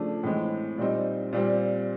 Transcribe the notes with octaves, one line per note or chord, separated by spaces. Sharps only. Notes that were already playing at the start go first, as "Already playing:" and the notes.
Already playing: C#3 F3 A3 D4
A2 E3 G#3 C4
A#2 G3 C4 D#4
A#2 G3 C4